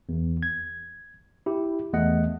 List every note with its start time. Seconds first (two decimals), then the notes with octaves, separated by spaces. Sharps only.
0.09 E2
0.43 G#6
1.46 E4 G4
1.93 E2 A3 D#5 F#5